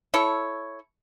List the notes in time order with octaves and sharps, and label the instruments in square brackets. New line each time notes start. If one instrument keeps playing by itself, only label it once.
[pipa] E4 A4 C#5